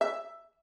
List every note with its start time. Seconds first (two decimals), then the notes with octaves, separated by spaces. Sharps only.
0.01 E5